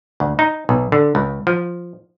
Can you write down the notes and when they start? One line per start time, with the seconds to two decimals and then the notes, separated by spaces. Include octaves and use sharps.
0.20 D2
0.39 D#4
0.69 B1
0.92 D3
1.15 C#2
1.47 F3